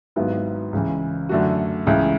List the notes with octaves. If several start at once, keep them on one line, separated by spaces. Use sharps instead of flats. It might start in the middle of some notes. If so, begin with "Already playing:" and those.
G#1 G#2 F#3 B3 E4
C#2 C#3 E3
F#2 D3 A3 D4 F#4
C#2 C#3 E3 A3 E4